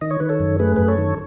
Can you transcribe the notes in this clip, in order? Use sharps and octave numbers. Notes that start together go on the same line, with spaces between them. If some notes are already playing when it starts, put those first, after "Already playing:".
D#3 D#5
C#5
D#3 B4
A4 C#5
F#2
A3 G#4 B4
F#2 B4
A4 C#5
D#3